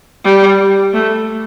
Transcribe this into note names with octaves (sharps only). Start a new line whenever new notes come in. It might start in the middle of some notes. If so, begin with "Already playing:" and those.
G3
A3